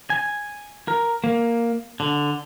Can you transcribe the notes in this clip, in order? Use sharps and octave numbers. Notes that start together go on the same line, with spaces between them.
G#5
A#4
A#3
D3